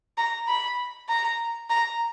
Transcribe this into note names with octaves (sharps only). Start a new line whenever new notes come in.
A#5
B5
A#5
A#5